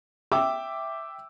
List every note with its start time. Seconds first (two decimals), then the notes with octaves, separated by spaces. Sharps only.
0.32 E5 G5 D6 E6